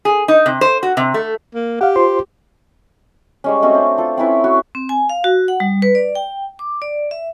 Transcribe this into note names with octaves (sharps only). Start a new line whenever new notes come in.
G#4
D#4
C3
C5
F#4
C3
A3
A#3
G4 F5 F#5
F4 C5 C6
G3 G#3 C#4
A3 C4 C#4 F#4
D4 C5
F4 A4
C4 C#4 E4 B4
F#4
C4
G#5
F5
F#4
F#5
G3
B4
D5
G5
D6
D5
E5